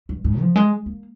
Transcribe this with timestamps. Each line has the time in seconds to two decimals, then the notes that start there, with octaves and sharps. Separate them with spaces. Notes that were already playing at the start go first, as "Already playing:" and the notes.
0.09 G2
0.24 G#2
0.40 F3
0.56 G#3
0.86 A#3